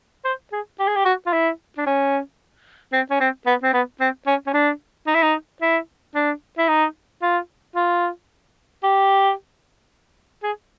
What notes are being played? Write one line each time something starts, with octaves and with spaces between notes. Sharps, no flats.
C5
G#4
G4
G#4
G4
F#4
F4
E4
D4
C#4
C4
C#4
C4
B3
C4
B3
C4
C#4
C#4
D4
D#4
E4
D#4
E4
D4
E4
D#4
F4
F4
G4
G#4